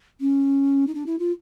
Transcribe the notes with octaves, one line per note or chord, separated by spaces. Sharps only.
C#4
D#4
D4
E4
F4